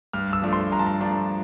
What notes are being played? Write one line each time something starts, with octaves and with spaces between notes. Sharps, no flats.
G2 F6
E6
F3 A3 D4
C6
G2 A#5
A5
A#5
F3 A3 D4